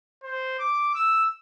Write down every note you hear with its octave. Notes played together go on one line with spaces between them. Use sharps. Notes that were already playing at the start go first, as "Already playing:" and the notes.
C5
D6
E6